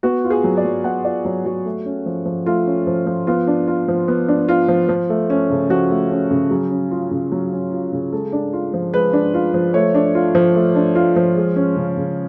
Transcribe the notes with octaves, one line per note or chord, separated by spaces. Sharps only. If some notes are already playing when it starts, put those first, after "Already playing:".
B3 F#4
F4
G#4
F#3
D5
F#3
B3 F#5
F4 D5
F#3 C#5
F#3 F#4
A3
C#4
F3
F3
A3 F4
C#4
F3
F3
B3 F4
D4
F4
F3
B3
D4
F4
F3
F3
A3
C#4
C#3
F3 F#4
A3
C#4
C#3
F#3 G#4
C#4
F4
C#3
F#3
C#4
F4
C#3
G#3 A4
D4
F4
F3
G#3 B4
D4
F4
F3
A3 C#5
D4
F4
F3
A3
D4
F4
F3
G#3
C#4
C#3
C#3